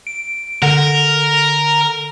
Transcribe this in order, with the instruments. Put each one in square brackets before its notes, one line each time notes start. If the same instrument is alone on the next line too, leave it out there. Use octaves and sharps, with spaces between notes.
[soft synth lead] D7
[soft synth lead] D3 [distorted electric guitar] A#4